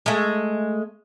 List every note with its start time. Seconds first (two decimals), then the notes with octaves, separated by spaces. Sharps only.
0.06 G#3 A3